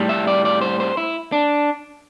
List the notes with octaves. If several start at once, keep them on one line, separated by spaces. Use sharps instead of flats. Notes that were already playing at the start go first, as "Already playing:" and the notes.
Already playing: A2 G3
E5
D5
D5
C5
C5
E4
D4